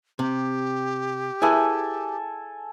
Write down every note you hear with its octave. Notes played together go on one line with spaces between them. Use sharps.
C3 G4
E4 G#4 A4 B4 G#5